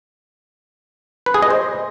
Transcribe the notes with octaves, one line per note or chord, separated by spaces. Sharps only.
B4
G#4
D#5
C5